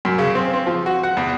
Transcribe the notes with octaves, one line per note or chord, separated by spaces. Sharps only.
F#2
C#3
C4
C4
F3
F#4
F#5
E2